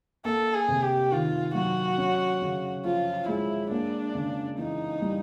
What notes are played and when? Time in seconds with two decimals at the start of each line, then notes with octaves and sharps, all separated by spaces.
0.25 A#3 A4
0.54 G#4
0.68 C3
0.82 G4
1.12 D#3 F4
1.55 F#3 F#4
1.98 C#4
2.42 C#3
2.85 F3 F4
3.28 G#3 E4
3.71 A#3 D4
4.15 C#3
4.58 E3 D#4
5.02 G3